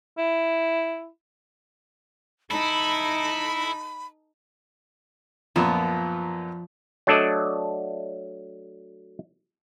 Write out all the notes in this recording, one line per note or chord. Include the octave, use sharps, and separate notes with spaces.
E4
D#4 E4 A4 B5
F#2 A#2 F3 B3
F#3 A3 D4 A4 D5 D#5